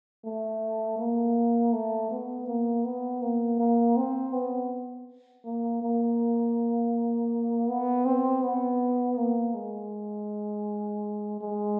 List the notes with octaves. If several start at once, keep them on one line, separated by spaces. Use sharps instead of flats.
A3
A#3
A3
B3
A#3
B3
A#3
A#3
C4
B3
A#3
A#3
B3
C4
B3
A#3
G#3
G#3